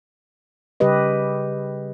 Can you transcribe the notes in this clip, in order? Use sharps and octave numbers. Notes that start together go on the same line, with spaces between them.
C#3 G3 G4 B4 D#5